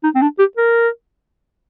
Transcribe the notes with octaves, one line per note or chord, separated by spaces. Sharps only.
D#4
C4
D4
G4
A#4